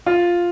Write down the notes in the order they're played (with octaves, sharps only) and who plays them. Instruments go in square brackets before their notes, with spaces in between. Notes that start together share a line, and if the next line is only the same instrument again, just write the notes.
[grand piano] F4